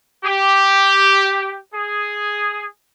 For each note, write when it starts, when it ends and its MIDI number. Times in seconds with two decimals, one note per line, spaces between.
0.24 1.56 67
1.74 2.65 68